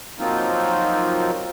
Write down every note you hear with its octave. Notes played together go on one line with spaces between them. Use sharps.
F3 F#3 A#3 C4 D#4 F4